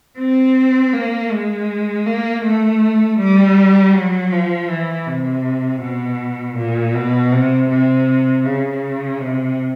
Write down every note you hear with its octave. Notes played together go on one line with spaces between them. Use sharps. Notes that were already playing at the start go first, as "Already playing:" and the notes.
C4
A#3
G#3
A#3
A3
G3
F#3
F3
E3
C3
B2
A#2
B2
C3
C3
C#3
C3